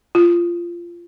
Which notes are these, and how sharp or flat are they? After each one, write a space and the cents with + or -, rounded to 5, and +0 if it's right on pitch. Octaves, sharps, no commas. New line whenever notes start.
F4 -20